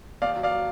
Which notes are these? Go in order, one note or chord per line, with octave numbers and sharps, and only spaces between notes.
D#2 D5 F5
F#3
D5 F5
F#3